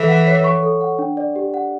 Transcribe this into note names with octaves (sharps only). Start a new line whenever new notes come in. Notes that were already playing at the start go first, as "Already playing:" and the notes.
Already playing: E3 A4
F#5
C#5
C#6
A4
F#5
D4
D5
G4
F#5